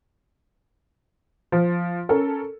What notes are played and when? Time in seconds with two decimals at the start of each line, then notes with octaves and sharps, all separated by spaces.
1.52 F3
2.09 C#4 A4 A#4